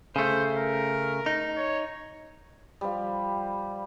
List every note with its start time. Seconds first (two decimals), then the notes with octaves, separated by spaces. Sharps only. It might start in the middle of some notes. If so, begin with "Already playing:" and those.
0.16 C#3 A3 C5
0.57 A#4
1.26 D#4
1.57 C#5
2.81 F3 G3